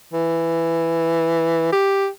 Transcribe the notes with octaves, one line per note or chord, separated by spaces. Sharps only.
E3
G4